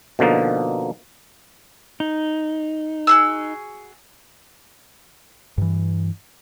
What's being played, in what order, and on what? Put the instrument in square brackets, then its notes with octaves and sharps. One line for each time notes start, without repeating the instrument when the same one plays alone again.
[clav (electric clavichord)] B2 D3 F3 A#3 D#4
[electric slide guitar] D#4
[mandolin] F#4 G#4 E6
[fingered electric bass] G2 E3